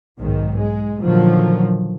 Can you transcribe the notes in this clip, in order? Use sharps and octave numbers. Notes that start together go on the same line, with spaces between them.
B1 G#2 D#3
G#3
A#2 D3 D#3 F3 F#3